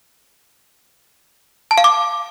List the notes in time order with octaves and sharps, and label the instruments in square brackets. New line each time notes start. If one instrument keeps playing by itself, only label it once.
[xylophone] A5
F5
D6